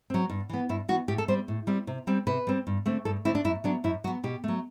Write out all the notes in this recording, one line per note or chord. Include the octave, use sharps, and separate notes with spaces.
F#3 C4
G2
E3 B3
G2 E4
E3 B3 F#4
A2 G4
A4
G3 C4 C5
A2
G3 C4
C3
G3 C4
C3 B4
G3 C4
G2
D3 A3 C4
G2 A4
D3 A3 C4 E4
D4
F#2 E4
F#3 B3 D4
F#2 E4
F#3 B3 F#4
B2 G4
F#3 A3